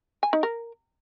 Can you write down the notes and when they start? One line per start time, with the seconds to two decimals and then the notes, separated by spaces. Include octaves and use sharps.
0.23 G#5
0.33 D#4
0.43 A#4